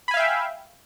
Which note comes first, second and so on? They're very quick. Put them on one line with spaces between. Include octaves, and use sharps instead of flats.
B5 G#5 F5 E5 G5